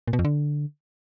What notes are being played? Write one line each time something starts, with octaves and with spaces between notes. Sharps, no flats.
A#2
B2
F2
D3